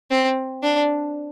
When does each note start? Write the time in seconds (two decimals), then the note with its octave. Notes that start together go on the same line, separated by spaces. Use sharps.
0.11 C4
0.63 D4